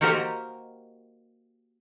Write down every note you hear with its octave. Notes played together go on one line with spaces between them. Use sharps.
A#3 F#4 G4 A#4 C5 D#5